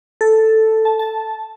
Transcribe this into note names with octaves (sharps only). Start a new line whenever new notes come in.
A4
A5
A5